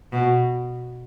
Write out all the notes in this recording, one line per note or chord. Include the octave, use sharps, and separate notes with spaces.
B2